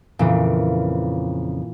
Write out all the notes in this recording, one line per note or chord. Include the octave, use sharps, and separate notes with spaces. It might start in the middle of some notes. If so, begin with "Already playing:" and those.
F2 A#2 C#3 E3